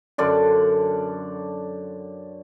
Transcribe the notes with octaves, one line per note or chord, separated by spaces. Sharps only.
F#2 D3 D5 C6